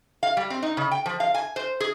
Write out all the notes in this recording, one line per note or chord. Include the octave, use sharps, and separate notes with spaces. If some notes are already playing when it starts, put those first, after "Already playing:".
F5
G3
C4
D#4
C#3
G5
F3
F5
G#5
C5
G#4